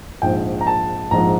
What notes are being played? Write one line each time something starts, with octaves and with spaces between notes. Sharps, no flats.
A#1 G#2 F3 G5
A#5
A5
A#1 G#2 F3 A#5